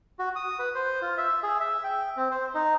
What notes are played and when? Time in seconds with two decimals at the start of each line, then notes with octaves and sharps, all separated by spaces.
0.19 F#4
0.36 D#6
0.59 B4
0.75 C5
1.02 F4
1.18 E5
1.43 G#4
1.60 E5
1.84 G5
2.17 C4
2.31 C5
2.54 D#4